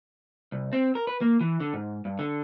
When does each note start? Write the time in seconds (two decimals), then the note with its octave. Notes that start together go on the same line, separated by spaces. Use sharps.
0.52 C2
0.73 C4
0.95 A#4
1.07 B4
1.21 A#3
1.41 E3
1.60 D3
1.74 G#2
2.05 G2
2.19 D3